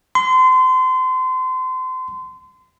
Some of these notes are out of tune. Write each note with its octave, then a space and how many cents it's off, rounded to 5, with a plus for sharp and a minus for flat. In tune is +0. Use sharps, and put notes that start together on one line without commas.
C6 -30